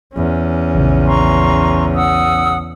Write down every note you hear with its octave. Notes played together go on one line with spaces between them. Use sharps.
E2 C#4
A#1 C#3
A#5 C6 C#6
F#5 D#6 E6